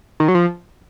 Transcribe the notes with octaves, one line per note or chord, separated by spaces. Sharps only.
D#3
F#3
F3